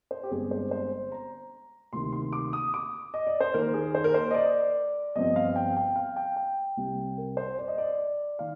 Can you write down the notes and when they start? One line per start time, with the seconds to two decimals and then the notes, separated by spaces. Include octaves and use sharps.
0.11 C5
0.23 G4
0.30 G1 G2 D3 G#3 C4 G#4
0.51 C5
0.71 C5
1.12 A#5
1.93 D2 C3 D#3 A#3 C6
2.13 C6
2.33 D6
2.53 D#6
2.74 D6
3.14 D#5
3.27 D5
3.40 C5
3.54 D#2 D#3 A#3 A#4
3.74 G#4
3.95 C5
4.04 A#4
4.14 C5
4.31 D#5
4.34 D5
5.15 G1 G2 F3 C4 D#5
5.36 F5
5.56 G5
5.77 G5
5.96 F5
6.16 G5
6.36 G5
6.77 C2 C3 G3
7.18 A#4
7.37 C5
7.58 D5
7.68 D#5
7.78 D5
8.39 D#3 F5